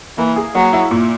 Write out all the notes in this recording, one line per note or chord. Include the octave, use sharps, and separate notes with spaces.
E3 A#3
G#4
F#3 A#3
E4
A#2